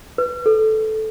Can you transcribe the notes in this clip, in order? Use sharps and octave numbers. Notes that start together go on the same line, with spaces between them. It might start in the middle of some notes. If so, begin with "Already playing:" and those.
B4
A4